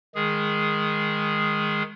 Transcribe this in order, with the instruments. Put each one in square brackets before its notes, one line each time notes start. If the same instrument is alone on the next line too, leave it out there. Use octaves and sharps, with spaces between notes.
[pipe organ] D#3 G#3 G#4